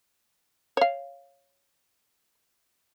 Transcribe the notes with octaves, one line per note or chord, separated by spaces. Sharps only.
C#5 F5